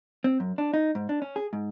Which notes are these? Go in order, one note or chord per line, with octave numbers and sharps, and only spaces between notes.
C4
F#2
D4
D#4
G#2
D4
C#4
G#4
G#2